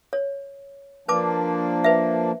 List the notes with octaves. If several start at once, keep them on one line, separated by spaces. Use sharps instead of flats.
C#5
F3 A#3 D4 B4 A5 D6
B4 E5